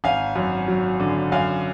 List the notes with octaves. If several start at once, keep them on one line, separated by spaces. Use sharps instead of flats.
G#1 F5 G#5
F#2
F#3
D3
F#2 F5 G#5